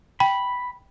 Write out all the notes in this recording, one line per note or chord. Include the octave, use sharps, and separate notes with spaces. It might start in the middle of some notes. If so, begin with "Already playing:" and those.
G5 B5